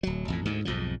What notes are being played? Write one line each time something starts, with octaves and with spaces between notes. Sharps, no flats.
D1 F#3
A1 F2 A2
D2 G#2 D3
B1 F2 G#2 F3